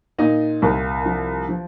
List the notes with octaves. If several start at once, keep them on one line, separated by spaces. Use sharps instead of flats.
A#2 D#4 D#5
C2
F3
F3